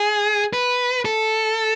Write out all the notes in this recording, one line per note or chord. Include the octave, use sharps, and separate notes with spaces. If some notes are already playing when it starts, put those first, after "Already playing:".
Already playing: G#4
B4
A4